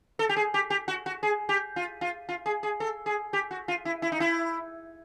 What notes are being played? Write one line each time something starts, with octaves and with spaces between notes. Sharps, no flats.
A4
G4
G#4
G4
G4
F#4
F#4
G#4
G4
F4
F4
F4
G#4
G#4
A4
G#4
G4
F#4
F4
E4
E4
D#4
E4